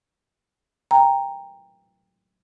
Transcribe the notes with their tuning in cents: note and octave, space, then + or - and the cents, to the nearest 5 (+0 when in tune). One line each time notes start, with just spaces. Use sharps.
G5 +20 A#5 +0